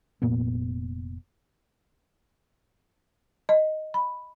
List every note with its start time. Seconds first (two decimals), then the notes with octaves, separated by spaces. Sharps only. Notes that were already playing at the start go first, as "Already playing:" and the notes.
0.22 F1 A#2 A#3 B3
3.49 D#5
3.94 B5